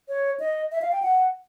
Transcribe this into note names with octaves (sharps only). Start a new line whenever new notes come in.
C#5
D#5
E5
F5
G5
F#5